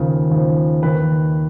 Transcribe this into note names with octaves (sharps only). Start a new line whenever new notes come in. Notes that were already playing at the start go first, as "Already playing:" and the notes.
Already playing: D#2 C#3 F3 A#4
D#2 C#3 F3
D#2 D#3 B4